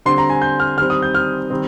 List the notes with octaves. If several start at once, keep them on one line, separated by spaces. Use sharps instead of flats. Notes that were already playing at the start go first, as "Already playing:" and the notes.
D3 G3 C4 C6
A#5
G#5
G6
F6
D#3 G3 C4 F6
D#6
G6
F6
D#3 G3 C4